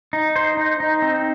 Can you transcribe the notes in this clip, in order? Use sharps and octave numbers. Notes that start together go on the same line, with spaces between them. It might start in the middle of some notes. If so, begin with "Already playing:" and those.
D#4
C5
D#4
D#4
C4